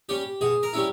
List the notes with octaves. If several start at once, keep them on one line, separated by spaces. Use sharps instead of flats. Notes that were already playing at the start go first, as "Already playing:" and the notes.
G3 C#4 G4
B2 G#4
A#4
G3 C#4 E4